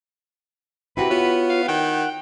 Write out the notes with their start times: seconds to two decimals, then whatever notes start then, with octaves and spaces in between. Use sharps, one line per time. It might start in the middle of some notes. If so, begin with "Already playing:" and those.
0.97 C3 E4 F#4 G4 B4
1.10 B3 F4 C#5
1.49 F5
1.68 D#3 F#5 G5